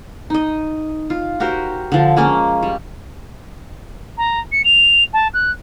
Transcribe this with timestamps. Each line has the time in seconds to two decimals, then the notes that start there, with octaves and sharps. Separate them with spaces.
0.30 D#4 D#5
1.10 F4
1.40 F#4 G4 A#4 C5
1.92 D3 F3
2.17 G#3 A#3 C#4
2.63 G3
4.17 A#5
4.51 C#7
4.64 F7
5.13 A5
5.33 F#6